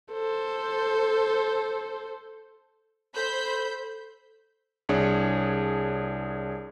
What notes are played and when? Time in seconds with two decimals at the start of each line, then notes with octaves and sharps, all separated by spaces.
0.13 A4 C5
3.16 A4 C5 B5 G6
4.89 C2 D4 G#4 C#5 C#7